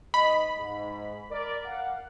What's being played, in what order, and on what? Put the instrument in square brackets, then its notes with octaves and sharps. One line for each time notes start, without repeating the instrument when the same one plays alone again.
[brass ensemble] G#2 D#5 [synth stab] B5
[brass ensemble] G#2
A#4 D5
A#4 F5 F#5